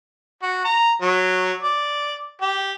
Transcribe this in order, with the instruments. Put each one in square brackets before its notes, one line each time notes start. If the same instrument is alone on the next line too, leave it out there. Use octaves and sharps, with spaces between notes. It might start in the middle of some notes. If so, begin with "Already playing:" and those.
[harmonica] F#4
A#5
F#3
D5
G4